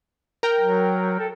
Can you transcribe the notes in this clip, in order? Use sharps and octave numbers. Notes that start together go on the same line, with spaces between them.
A#4 G5
F#3
A4